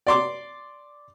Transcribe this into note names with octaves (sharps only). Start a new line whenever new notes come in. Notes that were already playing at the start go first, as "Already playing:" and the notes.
D5 C6 D6